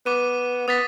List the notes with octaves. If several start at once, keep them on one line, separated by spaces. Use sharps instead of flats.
B3 D6 D#7
B3 D#6 A6 B6